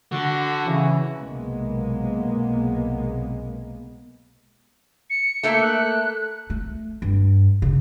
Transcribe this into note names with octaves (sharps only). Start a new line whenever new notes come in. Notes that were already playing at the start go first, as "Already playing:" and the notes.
D3 F#4
C#3 E3
B1 C3 G#3 A#3 B3
C#7
A3 A#3 E5
F#6
A3
G2
C#3